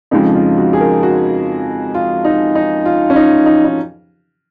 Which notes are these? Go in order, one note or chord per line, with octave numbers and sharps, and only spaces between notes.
F2 C#3 F3 G#3 D#4
F4
F#4
G#4
A#4
F#4
F4
D#4
D#4
F4
C#4
D#4
D#4
D#4